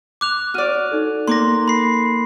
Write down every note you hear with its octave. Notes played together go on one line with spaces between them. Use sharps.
D6 F#6 F7
F#4 D5 F6 D#7
D#4 A4
A#3 C6 D6 A#6
B5 C7